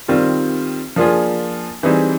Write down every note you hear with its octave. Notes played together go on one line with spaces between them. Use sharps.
D#3 G3 C4 F4
F3 A#3 D4 F4 G#4
E3 G3 C4 D#4 G#4